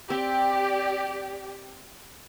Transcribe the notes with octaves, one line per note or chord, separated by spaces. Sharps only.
C4 G4 D5